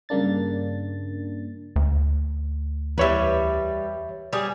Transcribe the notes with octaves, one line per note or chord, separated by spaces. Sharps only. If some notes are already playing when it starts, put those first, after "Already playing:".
G2 C#3 A#3 D4 A6
D2
E2 G3 B4 C#5 E5
G3 G#4